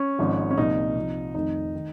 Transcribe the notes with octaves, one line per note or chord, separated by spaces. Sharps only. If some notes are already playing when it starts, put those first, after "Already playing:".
Already playing: C#4
G#1 G#2 F3
C#4
C2 A#2 F3 D#4
C2 C3 F3
F1 F2 D#3 D#4
D#3